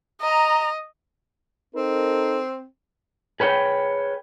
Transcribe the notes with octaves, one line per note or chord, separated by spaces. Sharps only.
D#5 A#5
C4 D#4 A4 A#4
G#4 B4 C#5 G5